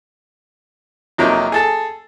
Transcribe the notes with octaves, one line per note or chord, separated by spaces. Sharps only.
F2 C3 F3 F#3 A#3 D#4
G#4 A4 A5